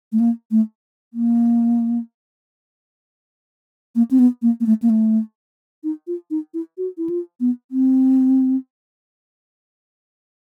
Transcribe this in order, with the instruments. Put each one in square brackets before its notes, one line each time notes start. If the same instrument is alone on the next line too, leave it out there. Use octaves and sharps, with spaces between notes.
[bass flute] A3
A#3
A3
A#3
A#3
C4
B3
A#3
A#3
A3
A#3
A3
D#4
F4
D#4
E4
F#4
E4
F4
B3
C4